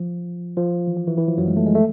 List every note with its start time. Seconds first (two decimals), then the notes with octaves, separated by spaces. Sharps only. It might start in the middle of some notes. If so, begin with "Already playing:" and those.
Already playing: F3
0.57 F3
0.87 E3
0.97 F3
1.07 E3
1.18 E3
1.28 F3
1.38 F#2 F#3
1.48 G#3
1.57 A3
1.66 G#3
1.75 A3